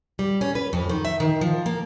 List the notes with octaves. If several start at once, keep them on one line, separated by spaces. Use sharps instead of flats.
G3
C#4
B4
F2
D#3
E5
D#3
F3
A#3